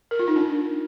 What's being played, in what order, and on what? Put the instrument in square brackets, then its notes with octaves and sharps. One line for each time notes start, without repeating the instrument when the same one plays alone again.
[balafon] A#4
F4
D#4
D4